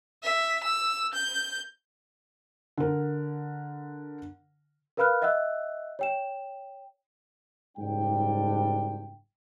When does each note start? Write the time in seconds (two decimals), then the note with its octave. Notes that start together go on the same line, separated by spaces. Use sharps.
0.23 E5
0.64 E6
1.14 G6
2.78 D3 A#4
4.97 A#4 B4 F5 B5 F6 F#6
5.22 D#5 E5 F#5 E6 F#6
5.99 C#5 G5 E7
7.78 F#1 G#2 G3 D4 G5